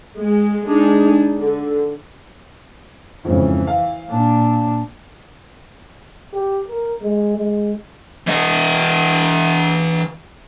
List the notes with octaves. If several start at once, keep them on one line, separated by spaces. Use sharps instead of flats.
G#3
G#3 D4 D#4 G#4
D3
F2 G#2 C#3 E3
F5
A#2 D4
G4
A#4
G#3
G#3
E3 D#5